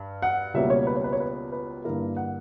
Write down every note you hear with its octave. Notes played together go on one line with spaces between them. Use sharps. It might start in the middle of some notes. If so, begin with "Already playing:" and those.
Already playing: G2
F#5
C#2 B2 G3 A#3 C#4 E5
C#5
B4
C#5
B4
C#5
B4
B4
G2 D3 A#3 E4 A#4
F#5